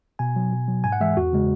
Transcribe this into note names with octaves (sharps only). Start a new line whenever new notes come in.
B2 G#5
F#3
B2
F#3
G#2 G#5
F#5
E3 G#3 E5
E2 F#4
C#3 G#3